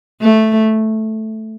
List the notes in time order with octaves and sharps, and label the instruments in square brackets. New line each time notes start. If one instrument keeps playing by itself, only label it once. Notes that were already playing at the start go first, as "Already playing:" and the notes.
[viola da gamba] A3